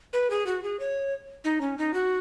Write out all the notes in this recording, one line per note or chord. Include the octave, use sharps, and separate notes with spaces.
B4
G#4
F#4
G#4
C#5
D#4
C#4
D#4
F#4